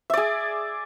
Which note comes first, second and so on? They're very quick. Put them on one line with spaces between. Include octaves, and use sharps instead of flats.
E5 D5 G#4